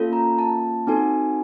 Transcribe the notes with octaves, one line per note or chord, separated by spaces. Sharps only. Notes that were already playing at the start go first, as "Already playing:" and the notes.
Already playing: A#3 C#4 F4 A4
A#5
A5
C4 D#4 F#4 A4 G#5